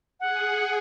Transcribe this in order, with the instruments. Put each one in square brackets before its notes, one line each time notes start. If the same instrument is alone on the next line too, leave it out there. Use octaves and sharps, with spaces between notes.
[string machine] G#4 [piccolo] F#5